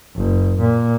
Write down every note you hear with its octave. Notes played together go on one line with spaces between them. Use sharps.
F#1
A#2